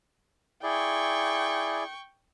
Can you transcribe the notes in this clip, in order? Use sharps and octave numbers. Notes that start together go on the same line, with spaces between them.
E4 G#4 D5 G5 C#6